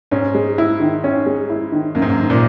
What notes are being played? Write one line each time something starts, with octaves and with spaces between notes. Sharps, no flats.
G#2 C#4
G#3
E4
D#3
C#4
G#3
E4
D#3
F#2 A#3
G#2
F#2
D#3
A#2